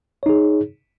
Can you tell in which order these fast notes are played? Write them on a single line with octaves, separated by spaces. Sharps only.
C#5 D#4 G#4